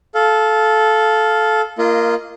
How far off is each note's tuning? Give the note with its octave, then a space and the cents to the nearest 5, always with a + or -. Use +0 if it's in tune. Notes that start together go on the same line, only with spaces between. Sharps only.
A4 -15 F5 +0
A#3 -5 F4 -30 D#5 -5